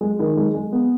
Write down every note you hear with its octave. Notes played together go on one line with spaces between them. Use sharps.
G#3
D#3
G#3
G#3
B3